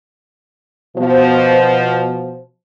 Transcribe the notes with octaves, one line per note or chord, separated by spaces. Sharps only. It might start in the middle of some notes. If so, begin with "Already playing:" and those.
B2 F3